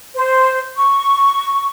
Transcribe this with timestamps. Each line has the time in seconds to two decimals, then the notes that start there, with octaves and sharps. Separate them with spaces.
0.15 C5
0.77 C#6